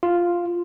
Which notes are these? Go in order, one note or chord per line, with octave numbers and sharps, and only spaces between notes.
F4